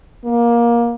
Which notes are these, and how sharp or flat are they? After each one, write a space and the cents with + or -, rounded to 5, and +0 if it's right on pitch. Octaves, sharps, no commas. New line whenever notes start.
A#3 +20